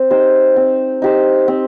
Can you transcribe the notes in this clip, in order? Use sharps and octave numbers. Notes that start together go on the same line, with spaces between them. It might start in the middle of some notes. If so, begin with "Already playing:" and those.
Already playing: C4
D#4 G4 C5
C4
D#4 G4 C5
C4